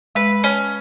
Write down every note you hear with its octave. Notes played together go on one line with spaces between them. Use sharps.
G#3 B4
C#4